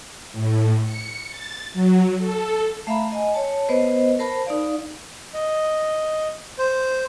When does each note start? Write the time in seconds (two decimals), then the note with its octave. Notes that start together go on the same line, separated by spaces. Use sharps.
0.32 A2
0.83 C#7
1.29 A6
1.73 F#3
2.18 A4
2.87 A3 E5 F5 A#5 B5
3.12 D#5 G#5
3.34 C#5 A5
3.68 B3 B4 C5 D#5
4.19 A#4 C5 A5 B5
4.46 D#4 D5 F5
5.34 D#5
6.58 C5